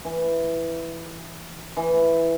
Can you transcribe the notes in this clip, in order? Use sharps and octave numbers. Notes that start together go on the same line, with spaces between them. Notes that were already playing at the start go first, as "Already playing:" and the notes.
E3
E3